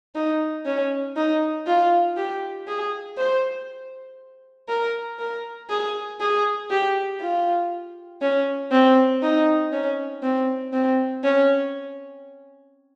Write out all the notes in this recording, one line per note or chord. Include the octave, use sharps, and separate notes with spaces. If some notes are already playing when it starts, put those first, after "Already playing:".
D#4
C#4
D#4
F4
G4
G#4
C5
A#4
A#4
G#4
G#4
G4
F4
C#4
C4
D#4
C#4
C4
C4
C#4